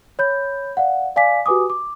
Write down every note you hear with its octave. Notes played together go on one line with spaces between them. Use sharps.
C#5 B5 G6
D5 F5 F#5
D5 F5 G#5 D6 B6
F#4 G4 B4 G#5 D6 D#6
D6